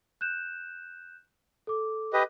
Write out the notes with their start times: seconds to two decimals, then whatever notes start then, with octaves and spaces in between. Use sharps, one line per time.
0.21 F#6 G6 E7
1.67 A4 D6
2.13 G4 B4 D#5